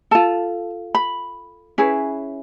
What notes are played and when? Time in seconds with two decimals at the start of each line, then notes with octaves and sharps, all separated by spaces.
0.11 F4 A4 A5
0.95 B5
1.78 C#4 E4 G#4 B4